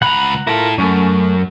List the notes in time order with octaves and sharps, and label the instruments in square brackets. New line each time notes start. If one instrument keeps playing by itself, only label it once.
[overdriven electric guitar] C#2 B5 [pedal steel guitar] F#5 A#5
[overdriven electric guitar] E4 A4 [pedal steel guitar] F4 A#4
[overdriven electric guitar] F#2 [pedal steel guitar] A3 C#4